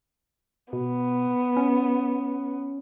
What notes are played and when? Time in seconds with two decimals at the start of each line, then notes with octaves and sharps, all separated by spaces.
0.73 B2 B3
1.57 C#4